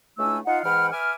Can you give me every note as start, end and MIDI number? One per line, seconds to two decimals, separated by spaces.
0.19 0.39 37
0.19 0.39 57
0.19 0.39 62
0.19 0.39 64
0.19 0.39 80
0.19 0.39 88
0.46 0.60 63
0.46 0.60 65
0.46 0.60 77
0.46 0.60 78
0.63 0.91 44
0.63 0.91 52
0.63 0.91 78
0.63 0.91 79
0.63 0.91 83
0.63 0.91 89
0.92 1.14 71
0.92 1.14 76
0.92 1.14 80
0.92 1.14 86
0.92 1.14 89